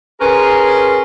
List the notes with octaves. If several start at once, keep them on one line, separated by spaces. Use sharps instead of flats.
C#4 G#4 A#4 B4 C6